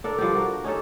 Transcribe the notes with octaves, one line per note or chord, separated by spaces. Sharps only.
D4 A4 A#4
F3 G3 D4 G4
F#4 A#4
C#4 D#4 G4 A4